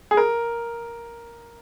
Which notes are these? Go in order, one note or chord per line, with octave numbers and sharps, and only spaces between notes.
G#4
A#4